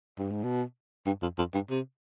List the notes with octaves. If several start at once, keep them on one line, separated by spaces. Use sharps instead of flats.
G2
G#2
B2
G2
F2
F2
G2
C3